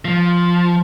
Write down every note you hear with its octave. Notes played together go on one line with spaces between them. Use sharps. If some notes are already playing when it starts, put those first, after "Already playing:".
F3